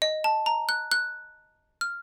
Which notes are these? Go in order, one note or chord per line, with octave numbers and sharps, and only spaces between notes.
D#5
A5
A#5
F#6
F#6
F6